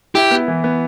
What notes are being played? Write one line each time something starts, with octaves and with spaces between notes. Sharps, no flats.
E4 G4
B3
E3
B3